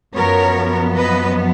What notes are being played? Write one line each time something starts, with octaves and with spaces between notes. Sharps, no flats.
F#2 F3 B3 A#4 C#5
B4 D#5